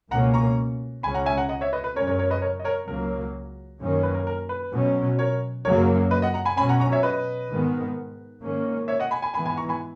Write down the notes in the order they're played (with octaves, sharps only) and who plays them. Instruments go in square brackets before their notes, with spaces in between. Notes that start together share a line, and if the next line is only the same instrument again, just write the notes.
[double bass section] C#2 B2 A#3 C#4 [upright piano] F#5 A#5
[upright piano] A#5 C#6
[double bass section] C#2 C#3 G#3 C#4 [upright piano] G#5 B5
[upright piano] F#5 A#5
E5 G#5
F#5 A#5
D#5 F#5
C#5 E5
B4 D#5
B4
[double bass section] F#2 C#3 G#3 C#4 [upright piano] A#4 C#5
[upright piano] A#4 C#5
A#4 C#5
B4 D#5
A#4 C#5
D#5
A#4 C#5
[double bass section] C#2 C#3 F#3 A#3 [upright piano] A#4
[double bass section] F#2 D#3 A#3 C#4
[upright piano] B4
A#4
A#4
B4
[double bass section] B2 F#3 C#4
[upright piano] A#4 C#5
[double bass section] F#2 C#3 F#3 A#3 [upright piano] A#4 C#5
[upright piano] B4 D#5
D#5 F#5
F#5 A#5
G#5 B5
[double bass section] B2 F#3 C#4 [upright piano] G#5 B5
[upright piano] F#5 A#5
A#5 C#6
C#5 E5
B4 D#5
[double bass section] G#2 D#3 G#3 B3
G#2 D#3 A#3 C#4
[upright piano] C#5 E5
D#5 F#5
G#5 B5
G#5 B5
[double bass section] G#2 E3 G#3 B3 [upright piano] G#5 B5
[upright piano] G#5 B5
A#5 C#6
G#5 B5